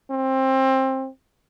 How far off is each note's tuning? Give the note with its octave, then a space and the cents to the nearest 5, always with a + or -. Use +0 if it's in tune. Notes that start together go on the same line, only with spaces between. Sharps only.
C4 +20